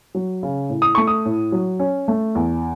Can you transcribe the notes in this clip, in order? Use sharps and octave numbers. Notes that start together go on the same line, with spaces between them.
F#3
C#3
A2
D#6
A3 C#6
D#6
A2
F#3
C#4
A3
E2